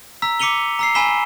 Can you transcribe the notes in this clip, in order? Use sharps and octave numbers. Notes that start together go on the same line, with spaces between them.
A#5 E6 B6
D6 B6 C#7 D#7 F7 G7
A#5 E6 C7
G#5 B5 E6 B6 E7 G7